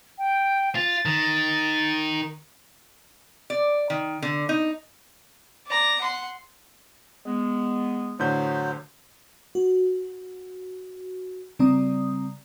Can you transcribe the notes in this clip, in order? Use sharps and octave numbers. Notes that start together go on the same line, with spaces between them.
G5
F4 A6
D#3
D5
D#3
D3
D#4
D5 A#5
F#5 C6
G#3 B3
A2 D3 F#3 C5 G6
F#4
C#3 G3 C4 D5 A#5 D#6